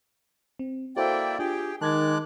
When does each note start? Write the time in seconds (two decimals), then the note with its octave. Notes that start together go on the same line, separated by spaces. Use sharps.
0.59 C4
0.96 A#3 E4 F#4 A4 C5 D5 G5 C6
1.39 D4 F4 G4 G#4 G5
1.81 D#3 G#3 A5 D6 F#6 G#6 A6